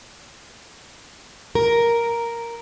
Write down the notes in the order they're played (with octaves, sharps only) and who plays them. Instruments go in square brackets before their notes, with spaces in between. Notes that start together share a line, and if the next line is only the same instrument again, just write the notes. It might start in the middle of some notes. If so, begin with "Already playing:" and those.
[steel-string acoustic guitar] A#4